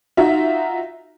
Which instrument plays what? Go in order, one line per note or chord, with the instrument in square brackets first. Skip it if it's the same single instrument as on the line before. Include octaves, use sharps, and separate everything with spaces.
[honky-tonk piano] D#4 F4 F#4 E5